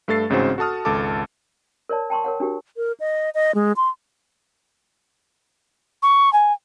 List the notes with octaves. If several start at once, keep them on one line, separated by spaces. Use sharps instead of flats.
G2 A3 A4 A6 C7
A1 G#2 C#3 C4 F#4 C5
F#4 A4 A5 D#6 F6
G#1 C#2 A4 A5 D6
A#4 C#5 D5 A5
G5 A5 C6 C#6
A#4 C#5 F#5
D4 F#4 G4 A#4
A#4
D#5
D#5
G#3
C6
C#6
G#5